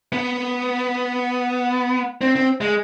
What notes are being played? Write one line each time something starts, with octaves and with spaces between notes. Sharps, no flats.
B3
C4
C4
G#3